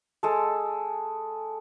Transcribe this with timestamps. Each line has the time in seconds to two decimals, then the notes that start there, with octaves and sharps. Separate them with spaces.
0.23 G#3 A4